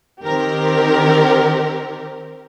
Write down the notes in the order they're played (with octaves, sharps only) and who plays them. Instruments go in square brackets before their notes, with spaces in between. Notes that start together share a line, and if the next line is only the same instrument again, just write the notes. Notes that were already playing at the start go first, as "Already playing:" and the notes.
[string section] D#3 C4 G4 A#4